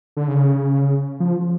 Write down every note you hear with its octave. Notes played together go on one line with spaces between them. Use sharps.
D3
C#3
F3